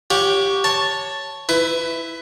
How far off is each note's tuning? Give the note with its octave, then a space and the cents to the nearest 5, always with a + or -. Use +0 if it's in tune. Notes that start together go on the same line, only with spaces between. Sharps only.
G4 +0 C#5 +10 F#5 -35
C#5 +0 A5 +0
E4 +0 B4 +20